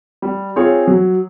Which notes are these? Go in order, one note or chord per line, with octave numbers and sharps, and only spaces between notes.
G3
C4 F4 G#4 C#5
F#3